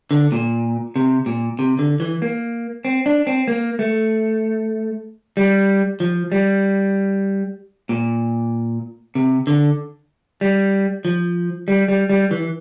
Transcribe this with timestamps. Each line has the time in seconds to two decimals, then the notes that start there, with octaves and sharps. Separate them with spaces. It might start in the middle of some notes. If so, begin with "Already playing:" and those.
0.11 D3
0.32 A#2
0.96 C3
1.26 A#2
1.59 C3
1.79 D3
2.00 E3
2.22 A#3
2.85 C4
3.06 D4
3.27 C4
3.48 A#3
3.79 A3
5.37 G3
6.00 F3
6.32 G3
7.89 A#2
9.15 C3
9.47 D3
10.41 G3
11.05 F3
11.68 G3
11.88 G3
12.09 G3
12.31 E3